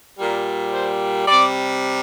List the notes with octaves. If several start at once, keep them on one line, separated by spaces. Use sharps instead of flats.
A#2 G3 A#4
C5
C3 G3 D5